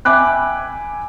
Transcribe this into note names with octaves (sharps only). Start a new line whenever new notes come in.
E5 G5 G#5 B5 D6 F#6